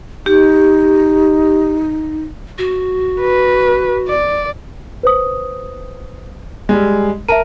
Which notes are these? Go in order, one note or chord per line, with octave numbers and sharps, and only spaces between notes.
D#4 G4
F#4
B4
D5
B4 C5 D#6
G3 G#3
A#4 E5 A5 D#7